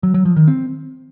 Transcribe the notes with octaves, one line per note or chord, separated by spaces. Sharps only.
F#3
F#3
F3
D#3
C4